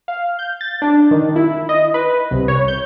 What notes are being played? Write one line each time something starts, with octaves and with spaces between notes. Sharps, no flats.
F5
G6
A6
D4
D#3
E4
D#5
B4
C2
C#5
G6